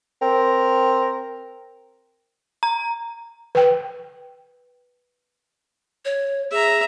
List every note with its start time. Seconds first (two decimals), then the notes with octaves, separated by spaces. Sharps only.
0.22 C4 A#4
2.63 A#5
3.55 B4 G5
6.05 C#5
6.51 G#4 E5 A#5